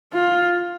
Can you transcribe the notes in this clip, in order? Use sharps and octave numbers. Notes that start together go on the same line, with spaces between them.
F4